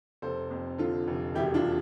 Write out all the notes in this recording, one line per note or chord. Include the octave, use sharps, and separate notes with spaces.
F1 A4 C5
F2
D3 F4 A4
F1
E1 E4 G4
D4 F4